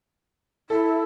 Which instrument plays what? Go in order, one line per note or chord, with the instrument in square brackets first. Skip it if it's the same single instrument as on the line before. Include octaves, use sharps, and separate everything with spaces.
[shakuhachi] E4 [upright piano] A4